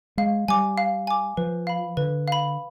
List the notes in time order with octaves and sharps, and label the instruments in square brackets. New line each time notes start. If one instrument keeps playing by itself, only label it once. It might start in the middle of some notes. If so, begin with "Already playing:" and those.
[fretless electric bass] G#3 [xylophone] F5
[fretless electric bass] G3 [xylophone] G#5 D6
[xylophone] F5
G#5 D6
[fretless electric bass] F3 [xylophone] B4
[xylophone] F5 B5
[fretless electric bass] D3 [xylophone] B4
[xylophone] F5 B5